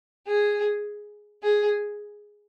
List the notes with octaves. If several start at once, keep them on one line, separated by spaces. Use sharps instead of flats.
G#4
G#4